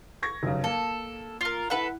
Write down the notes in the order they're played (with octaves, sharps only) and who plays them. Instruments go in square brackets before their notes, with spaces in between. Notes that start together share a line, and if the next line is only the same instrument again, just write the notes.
[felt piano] C#6 G#6 A#6
F1 F#2 C#3
[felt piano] A#3 [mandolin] A4
[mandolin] F4 A#4
[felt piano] E4 F#5 [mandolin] A4 B4